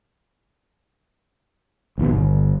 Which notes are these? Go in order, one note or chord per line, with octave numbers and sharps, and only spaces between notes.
A#1 D#2 B2
G1